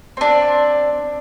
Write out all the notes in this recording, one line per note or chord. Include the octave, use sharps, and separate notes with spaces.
C4 D4